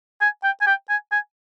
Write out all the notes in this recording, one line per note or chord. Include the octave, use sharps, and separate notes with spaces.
G#5
G5
G#5
G5
G#5
G#5